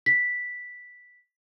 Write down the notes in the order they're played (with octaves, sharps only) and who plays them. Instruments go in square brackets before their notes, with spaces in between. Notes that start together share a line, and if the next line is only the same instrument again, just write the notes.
[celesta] B6